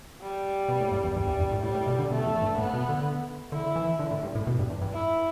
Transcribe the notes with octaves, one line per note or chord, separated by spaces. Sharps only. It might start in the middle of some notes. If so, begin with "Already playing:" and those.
G3
B2
A2
G2
E2
G2 G3
E2
G2
A2
A2 G3
A2
B2
D3
B2 A3
E2
G2
A2 B3
B2
D3
D3 E4
E3
D3
A2
G2
A2
B2
G2
E2
G2
E4